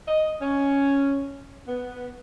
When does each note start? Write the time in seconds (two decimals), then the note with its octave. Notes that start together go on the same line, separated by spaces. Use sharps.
0.08 D#5
0.41 C#4
1.67 B3